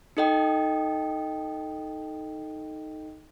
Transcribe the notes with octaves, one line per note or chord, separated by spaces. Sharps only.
D#4 A4 D#5 G5